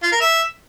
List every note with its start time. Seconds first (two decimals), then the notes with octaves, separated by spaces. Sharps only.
0.03 F4
0.12 A#4
0.21 E5